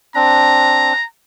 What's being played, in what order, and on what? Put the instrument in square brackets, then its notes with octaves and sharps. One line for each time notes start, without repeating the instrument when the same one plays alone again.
[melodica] C4 D4 [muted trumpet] A#5